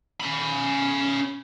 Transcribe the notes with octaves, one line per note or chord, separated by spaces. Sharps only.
C#4 B5